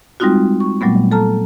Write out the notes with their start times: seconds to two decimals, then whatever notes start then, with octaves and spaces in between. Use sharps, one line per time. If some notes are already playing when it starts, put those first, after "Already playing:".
0.20 G3 G#3 C4 D#4 F4 F#4
0.60 C#6
0.81 A#2 F#3 G3 A3 B3
1.11 A4 A5 A#5 F6